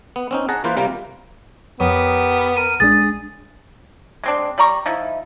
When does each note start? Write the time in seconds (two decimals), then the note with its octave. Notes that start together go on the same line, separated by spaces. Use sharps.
0.16 B3
0.31 C4 C#4 D#4
0.49 G#4 F#5 A5 A#5
0.64 E3 A#3 F4 B4 C5
0.77 C3 G3 A#3 F4 A#4
1.80 F2 B3 G4 A#4 C#5 D#6
2.57 A#4 D#7
2.80 A#1 G#3 D4 G#4 D#6 A6
4.23 G#3 C4 D4
4.58 G3 D5 A#5 C#6
4.86 F3 D#4 E4